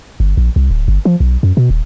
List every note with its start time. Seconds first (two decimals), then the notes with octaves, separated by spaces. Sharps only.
0.20 G1
0.37 A#1
0.56 C2
0.71 D1
0.88 G1
1.05 F3
1.20 B1
1.43 F#2
1.57 B2
1.70 D#1